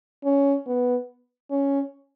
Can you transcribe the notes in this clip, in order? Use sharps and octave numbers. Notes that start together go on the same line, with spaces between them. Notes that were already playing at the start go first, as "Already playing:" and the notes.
C#4
B3
C#4